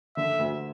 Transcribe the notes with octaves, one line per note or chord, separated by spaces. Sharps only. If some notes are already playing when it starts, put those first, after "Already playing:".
D3 E5
D2